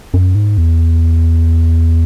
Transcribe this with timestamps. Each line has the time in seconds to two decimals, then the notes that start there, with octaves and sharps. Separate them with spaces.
0.14 F#2
0.35 G#2
0.58 E2